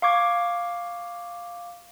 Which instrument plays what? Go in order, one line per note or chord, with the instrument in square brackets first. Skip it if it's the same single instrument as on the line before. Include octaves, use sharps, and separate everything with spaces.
[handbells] F5 C#6 D6 G#6